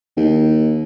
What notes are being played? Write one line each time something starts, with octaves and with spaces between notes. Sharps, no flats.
D#2